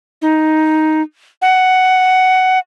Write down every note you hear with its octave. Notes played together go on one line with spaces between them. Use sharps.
D#4
F#5